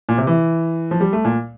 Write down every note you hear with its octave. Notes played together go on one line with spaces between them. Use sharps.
A#2
C3
E3
F3
G3
A3
A#2